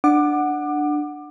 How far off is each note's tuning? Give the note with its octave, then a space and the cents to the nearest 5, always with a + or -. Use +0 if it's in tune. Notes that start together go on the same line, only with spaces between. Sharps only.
D4 +15 F#5 +0 D6 +25